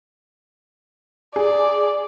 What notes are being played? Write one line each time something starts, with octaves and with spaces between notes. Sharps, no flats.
G#4 D5